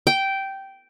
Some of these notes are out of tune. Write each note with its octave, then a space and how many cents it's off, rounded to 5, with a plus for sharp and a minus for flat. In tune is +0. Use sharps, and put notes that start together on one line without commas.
G5 -10